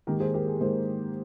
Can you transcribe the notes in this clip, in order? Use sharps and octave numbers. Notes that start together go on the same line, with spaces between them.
G#2 D#3 A#3 G4 A#4
G#4 C5
G4 A#4
G#4
G#2 D#3 A#3 G#4 C5